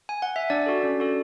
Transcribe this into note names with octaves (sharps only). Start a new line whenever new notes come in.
G#5
F#5
E5
D4 D5
F#4 A4
C#4
F#4 A4